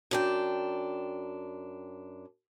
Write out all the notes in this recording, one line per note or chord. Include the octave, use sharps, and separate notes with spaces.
F#2 D4 G5